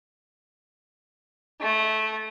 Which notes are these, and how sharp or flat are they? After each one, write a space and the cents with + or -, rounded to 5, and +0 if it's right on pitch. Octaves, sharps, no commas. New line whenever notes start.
A3 -15